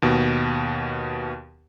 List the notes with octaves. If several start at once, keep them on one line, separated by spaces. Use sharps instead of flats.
D#2 B2